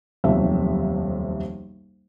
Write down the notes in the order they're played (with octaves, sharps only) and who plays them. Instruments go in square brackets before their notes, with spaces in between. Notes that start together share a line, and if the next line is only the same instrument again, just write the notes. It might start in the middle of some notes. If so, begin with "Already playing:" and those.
[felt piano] D#1 B1 F2 C3 E5